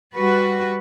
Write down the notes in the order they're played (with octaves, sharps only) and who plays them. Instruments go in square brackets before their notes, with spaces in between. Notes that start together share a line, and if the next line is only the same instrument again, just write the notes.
[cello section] G3 F#4 B4